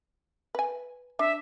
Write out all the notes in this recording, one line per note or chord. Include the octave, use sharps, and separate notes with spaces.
B4 G#5
D4 E5